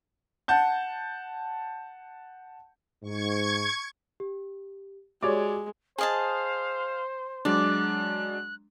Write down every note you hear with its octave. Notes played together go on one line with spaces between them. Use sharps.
F#5 A5 G6
G#2 C#6 G#6
G4
G#3 F#4 G4 C#5 D5 D6
G#4 C5 D#5 F5 A5
F#3 G#3 D4 D5 F#6